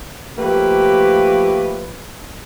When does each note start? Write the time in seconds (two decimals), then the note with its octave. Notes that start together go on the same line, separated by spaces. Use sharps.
0.38 F3 A3 A#3 G4 B4